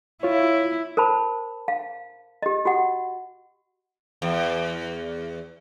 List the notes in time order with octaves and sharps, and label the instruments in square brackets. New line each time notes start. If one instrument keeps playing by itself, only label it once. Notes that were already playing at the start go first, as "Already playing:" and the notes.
[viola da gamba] E4 [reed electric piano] F4 C#5
[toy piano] A#4 C5 A5 B5
F5
G4 D#5
F#4 G4 F#5
[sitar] E2